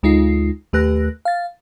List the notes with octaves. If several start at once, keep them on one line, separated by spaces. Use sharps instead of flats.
D2 G#3 D#4 F4 C7
D#2 A3 G4 B4 F#6 A#6
F5 A6